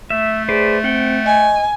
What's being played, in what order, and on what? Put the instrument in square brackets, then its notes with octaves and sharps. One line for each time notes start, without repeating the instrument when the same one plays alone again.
[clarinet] A3 [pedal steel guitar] E5
[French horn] G#4 [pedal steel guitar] B4 C5 D5
[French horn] C4 [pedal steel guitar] F#5 G5
[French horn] D#5 [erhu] G#5